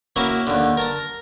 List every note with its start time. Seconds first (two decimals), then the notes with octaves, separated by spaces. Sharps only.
0.16 A#3 C#4 E4 F#4
0.47 D#2 D3
0.77 A#4 A5 A#5